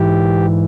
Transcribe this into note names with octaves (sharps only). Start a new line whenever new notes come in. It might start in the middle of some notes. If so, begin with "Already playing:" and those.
Already playing: G#2 E3 G4